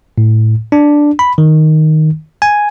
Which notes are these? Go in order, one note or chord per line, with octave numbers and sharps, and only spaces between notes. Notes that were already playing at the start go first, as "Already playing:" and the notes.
A2
D4
B5
D#3
G#5